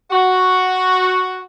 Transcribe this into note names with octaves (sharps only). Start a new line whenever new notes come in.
F#4